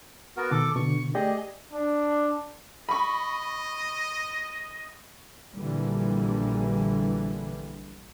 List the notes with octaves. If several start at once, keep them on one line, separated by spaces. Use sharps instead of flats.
B3 F#4 A#4
B2 D#3 A4 D6
B2 D3 C#6
A3 G4 G#4 D5 D#5
D4
D#5 B5 C#6
A#1 A#2 D3 E3 G3